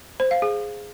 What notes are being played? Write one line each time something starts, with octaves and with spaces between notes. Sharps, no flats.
C5
F5
G#4